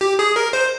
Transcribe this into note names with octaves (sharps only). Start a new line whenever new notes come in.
G4
G#4
A#4
C5